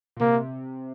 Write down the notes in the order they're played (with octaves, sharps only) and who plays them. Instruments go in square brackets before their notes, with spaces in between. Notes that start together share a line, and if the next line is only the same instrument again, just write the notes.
[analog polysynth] A#2
[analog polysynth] C3 [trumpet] A#3